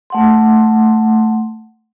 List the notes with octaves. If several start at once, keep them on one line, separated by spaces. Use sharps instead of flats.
A3 F#5 C6